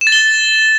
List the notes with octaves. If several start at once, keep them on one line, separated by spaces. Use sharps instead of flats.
E7
A6
G7